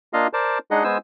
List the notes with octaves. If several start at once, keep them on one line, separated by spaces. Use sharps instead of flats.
A#3 D4 F4 D#5 F5
A#4 C5 D5 A5
G#3 D4 D#4 G#4 D#5 F#5
G#3 B3 C5 G#5 E6